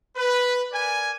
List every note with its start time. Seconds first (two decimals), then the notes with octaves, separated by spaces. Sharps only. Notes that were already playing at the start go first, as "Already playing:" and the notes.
0.16 B4
0.72 A#4 D5 G#5